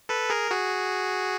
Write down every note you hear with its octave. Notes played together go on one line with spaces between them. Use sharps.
A4 B4
G#4 A#4
F#4 G#4